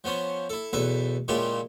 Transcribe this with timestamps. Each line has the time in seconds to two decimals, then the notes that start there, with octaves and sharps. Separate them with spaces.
0.04 F3 B3 C#4 C5
0.50 E4 A4
0.73 B1 E2 A4 B4 E5
1.28 A#2 C#3 G#3 E4 F4 G4